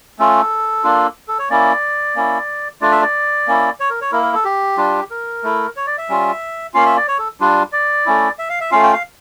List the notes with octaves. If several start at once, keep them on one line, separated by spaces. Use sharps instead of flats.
A3 C#4 F4 A4
A#3 D4 F4
A4
C#5
A#3 C#4 E4 D5
A#3 C#4 E4
A3 D4 F4 D5
E5
D5
A#3 C#4 E4
C#5
A#4
C#5
A#3 E4 A#4
A#4
A4
G4
G3 D4 F4
A#4
A3 E4
C#5
D5
E5
G3 C#4 F4
A#3 C#4 F4 F5
E5
D5
C#5
A4
G3 D4 F4
D5
A3 C#4 E4
E5
F5
E5
A3 C#4 F4 F5
G5
F5